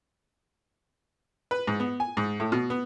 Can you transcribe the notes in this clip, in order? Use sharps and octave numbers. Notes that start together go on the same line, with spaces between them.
B4
G#2
B3
G#5
G#2
A2
B2
B3